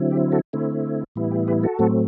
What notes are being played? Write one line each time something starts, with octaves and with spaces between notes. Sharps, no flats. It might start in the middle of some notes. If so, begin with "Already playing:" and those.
Already playing: D3 F#3 C4 E4
G4
F#4 A4
D3 A3 C4 E4
A2 E3 G3 B3 E4
G4
G4 B4
F#4 A4
A2 F#3 A3 C4